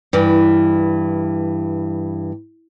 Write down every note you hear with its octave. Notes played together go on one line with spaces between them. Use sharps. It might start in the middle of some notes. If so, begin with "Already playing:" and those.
G2 E3